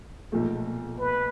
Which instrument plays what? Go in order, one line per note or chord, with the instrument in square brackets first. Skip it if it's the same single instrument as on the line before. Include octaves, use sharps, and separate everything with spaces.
[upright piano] B1 A#2 F3 A3
[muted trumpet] B4